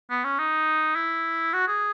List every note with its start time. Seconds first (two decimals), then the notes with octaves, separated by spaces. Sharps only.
0.10 B3
0.24 C#4
0.39 D#4
0.95 E4
1.53 F#4
1.68 G#4